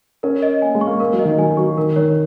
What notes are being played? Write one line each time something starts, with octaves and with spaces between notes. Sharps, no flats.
C#4 A#4
D#5
A#3 G#5
G#3
C#6
A#3
A#3 A#4
F#3
D#5
D#3
F#3 G#5
F#3 C#6
D#3 A#4
D#3 C#5